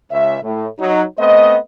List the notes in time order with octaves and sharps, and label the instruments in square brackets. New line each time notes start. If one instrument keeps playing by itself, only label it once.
[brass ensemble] C#2 C#4 E5
A2
F#3 D#4
A3 B3 C4 C5 D#5